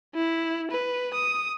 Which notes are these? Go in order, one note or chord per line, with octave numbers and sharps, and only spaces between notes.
E4
B4
D#6